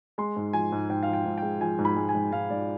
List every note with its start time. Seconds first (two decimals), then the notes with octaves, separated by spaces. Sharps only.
0.18 G#3 C6
0.36 G#2
0.53 F3 G#5
0.72 G#2
0.89 G#2 G5
1.03 F3 F5
1.13 G5
1.26 G#2
1.38 G#3 G5
1.61 F3 G#5
1.79 G#2
1.85 B5
1.96 G#3
2.09 G#5
2.15 G#2
2.32 G#2 F5
2.50 G#2 D5